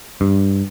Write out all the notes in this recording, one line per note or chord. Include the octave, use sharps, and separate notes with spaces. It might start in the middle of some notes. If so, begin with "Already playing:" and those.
G2